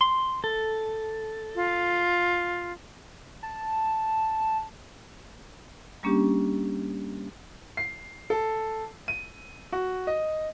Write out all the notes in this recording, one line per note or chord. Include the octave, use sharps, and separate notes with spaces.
C6
A4
F4
A5
G3 A#3 C#4 D4 G4
C7
A4
D#7
F#4
D#5